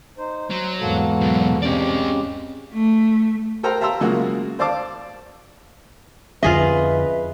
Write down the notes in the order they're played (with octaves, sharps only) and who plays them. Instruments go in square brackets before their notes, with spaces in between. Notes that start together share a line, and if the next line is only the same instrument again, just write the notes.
[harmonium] D#4 C5
[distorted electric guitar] F#3 [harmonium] C5
[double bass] E2 G#2 [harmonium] A#3 F#4 A4
[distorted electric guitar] B2 F#3
[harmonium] C#3 G#3 G4 [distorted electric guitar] C4 D5 [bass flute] C#4
[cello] A3
[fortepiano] A4 A#4 C5 G5 A#5
E5 F5 A5 A#5 C6 E6
C#3 F#3 G#3 A#3 F4 F#4
C5 D5 F5 A5 D6
[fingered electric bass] F2 D3 C#4 [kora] F4 G#4 D#5 [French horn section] B4 [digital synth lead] E5